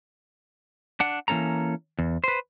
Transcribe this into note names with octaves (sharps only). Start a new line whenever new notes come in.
D4 F#5
E3 A#3 C#4 A4 A#5
E2
B4 C5